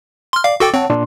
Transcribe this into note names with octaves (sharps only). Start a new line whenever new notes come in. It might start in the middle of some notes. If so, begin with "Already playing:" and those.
C6 F6
D5 F5
F#4 A4 G5 D6 A6
C4 C#5 F#5 A5
A#2 D4 C6